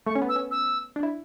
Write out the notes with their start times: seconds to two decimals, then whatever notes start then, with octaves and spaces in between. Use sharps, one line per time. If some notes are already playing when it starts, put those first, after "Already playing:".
0.06 A3 C#6
0.15 C#4
0.22 B3
0.29 E6
0.36 C#4
0.51 E6
0.96 D4
1.03 E4